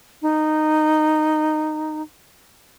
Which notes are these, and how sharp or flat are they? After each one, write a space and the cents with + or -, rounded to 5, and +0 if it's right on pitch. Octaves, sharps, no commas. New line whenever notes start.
D#4 -15